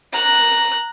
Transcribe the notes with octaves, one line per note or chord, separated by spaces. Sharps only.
A#5 F#6